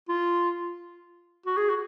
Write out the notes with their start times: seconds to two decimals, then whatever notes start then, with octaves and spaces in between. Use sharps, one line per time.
0.09 F4
1.46 F#4
1.58 G#4
1.69 F#4